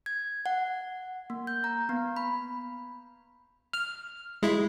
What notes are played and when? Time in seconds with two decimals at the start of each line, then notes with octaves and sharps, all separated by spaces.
0.06 G#6
0.46 F#5
1.30 A#3
1.47 G6
1.64 A#5
1.89 B3
2.16 B5
3.73 F6
4.43 G#3 E4